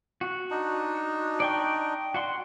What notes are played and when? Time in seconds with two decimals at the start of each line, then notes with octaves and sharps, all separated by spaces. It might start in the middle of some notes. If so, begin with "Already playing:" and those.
0.21 F#4
0.51 D4 D#4
1.40 D5 G5 C#6
2.14 F#4 F#5 C6